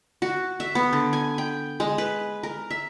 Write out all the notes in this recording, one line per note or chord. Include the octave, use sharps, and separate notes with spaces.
F#4
E5
B3
D3
G#5
G5
G#3
B4
A#4
E5